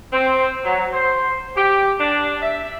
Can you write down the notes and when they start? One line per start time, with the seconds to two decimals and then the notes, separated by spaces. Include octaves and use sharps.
0.12 C4
0.63 F#3
0.93 C5
1.55 G4
1.99 D4
2.41 E5